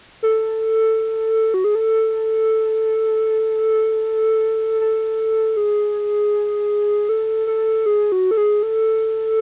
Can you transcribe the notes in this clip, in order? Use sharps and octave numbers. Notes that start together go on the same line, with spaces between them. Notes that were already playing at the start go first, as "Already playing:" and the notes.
A4
F#4
G#4
A4
A4
G#4
A4
A4
G#4
F#4
A4
G#4
A4